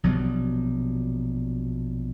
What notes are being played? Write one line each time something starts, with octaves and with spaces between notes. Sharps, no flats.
A#1 B2 F#3 G3